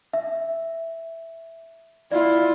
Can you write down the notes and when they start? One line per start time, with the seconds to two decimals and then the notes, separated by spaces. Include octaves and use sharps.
0.13 E5
2.11 E4 F4 D5